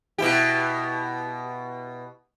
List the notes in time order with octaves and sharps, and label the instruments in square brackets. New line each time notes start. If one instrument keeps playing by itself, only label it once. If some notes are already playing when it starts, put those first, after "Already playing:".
[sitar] B2 E4 G4